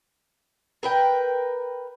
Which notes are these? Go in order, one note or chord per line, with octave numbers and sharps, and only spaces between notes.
A#4 B4 G5